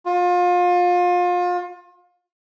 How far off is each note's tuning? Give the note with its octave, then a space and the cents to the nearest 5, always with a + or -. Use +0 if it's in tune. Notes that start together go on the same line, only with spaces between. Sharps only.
F4 +30